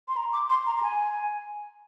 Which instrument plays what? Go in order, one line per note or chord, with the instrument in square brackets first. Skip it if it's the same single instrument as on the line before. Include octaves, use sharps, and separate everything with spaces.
[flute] C6
A#5
D6
C6
A#5
A#5
G#5